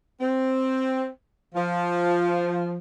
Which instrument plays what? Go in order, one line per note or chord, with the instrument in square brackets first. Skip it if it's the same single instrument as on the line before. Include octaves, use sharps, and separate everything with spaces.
[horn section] C4
F3